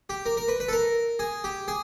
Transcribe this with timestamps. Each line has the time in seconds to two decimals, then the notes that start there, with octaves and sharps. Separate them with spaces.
0.09 G4
0.26 A#4
0.37 A#4
0.48 B4
0.60 B4
0.68 A4
0.73 A#4
1.19 G#4
1.44 G4
1.68 G#4